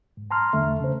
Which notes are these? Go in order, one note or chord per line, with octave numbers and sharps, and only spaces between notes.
G#2
A5 A#5 C6 C#6 F6
E2 D3 A3 E5
C#3 C5